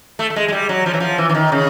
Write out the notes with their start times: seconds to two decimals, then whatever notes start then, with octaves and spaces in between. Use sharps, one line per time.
0.19 A3
0.30 A3
0.36 G#3
0.48 G#3
0.52 G3
0.69 F#3
0.86 F3
0.94 E3
1.00 F3
1.18 E3
1.29 E3
1.35 D#3
1.52 C#3